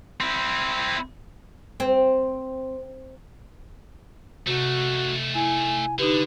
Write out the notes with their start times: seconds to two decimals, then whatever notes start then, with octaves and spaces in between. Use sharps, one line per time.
0.21 C4 E4
1.80 C4
4.47 C3 A3 D#4 F#4
5.35 E4 G#5
5.99 D3 D#4 G4 B4